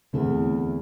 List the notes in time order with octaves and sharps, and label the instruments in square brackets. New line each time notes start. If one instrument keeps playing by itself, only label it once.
[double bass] E2 [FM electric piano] D3 A3 C4 E4 A4